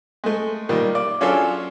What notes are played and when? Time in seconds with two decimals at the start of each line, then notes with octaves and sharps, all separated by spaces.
0.24 G#3 A3
0.69 A#2 D#3 G3
0.95 D5
1.21 F#3 C#4 D4 F4 G#4 A4